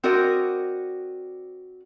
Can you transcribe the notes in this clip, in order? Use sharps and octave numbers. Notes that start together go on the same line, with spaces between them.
C4 F#4 A#4 D5 D#5